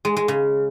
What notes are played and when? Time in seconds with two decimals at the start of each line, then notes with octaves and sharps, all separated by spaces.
0.05 G#3
0.17 G#3
0.28 C#3